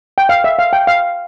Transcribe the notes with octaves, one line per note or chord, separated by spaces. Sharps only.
G5
F5
E5
F5
G5
F5